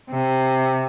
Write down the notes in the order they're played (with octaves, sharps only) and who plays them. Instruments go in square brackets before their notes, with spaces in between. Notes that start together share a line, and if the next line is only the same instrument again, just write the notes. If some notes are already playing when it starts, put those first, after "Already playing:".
[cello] C3